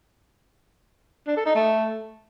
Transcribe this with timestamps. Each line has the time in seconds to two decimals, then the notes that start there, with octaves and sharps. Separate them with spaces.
1.27 D4
1.37 A4
1.46 D#4
1.55 A3